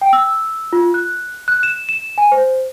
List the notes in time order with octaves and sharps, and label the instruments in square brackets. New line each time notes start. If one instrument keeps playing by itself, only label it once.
[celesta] G5
E6
F4
F#6
F#6
E7
E7
G#5
C5